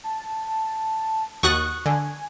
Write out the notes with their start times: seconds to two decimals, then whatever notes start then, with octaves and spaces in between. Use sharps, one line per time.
0.04 A5
1.43 D#2 F#4 C#6 D#6 F#6 A6
1.86 D3 G#5